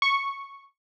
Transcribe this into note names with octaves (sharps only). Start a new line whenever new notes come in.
C#6